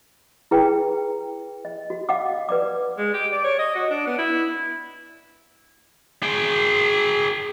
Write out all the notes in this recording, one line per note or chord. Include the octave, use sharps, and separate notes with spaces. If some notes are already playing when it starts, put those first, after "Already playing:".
E4 G#4 B4 G5
D#5
F#4
D#5 F5 F#5 D6
B4 D5 D6
G#3
G4
D5
C#5
D#5
F#4
D4
B3
E4
G#4 G5